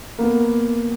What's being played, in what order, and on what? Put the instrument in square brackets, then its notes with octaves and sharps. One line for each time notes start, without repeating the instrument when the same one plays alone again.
[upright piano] A#3 B3